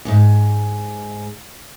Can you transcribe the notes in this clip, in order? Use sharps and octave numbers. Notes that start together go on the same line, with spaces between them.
E2 G#2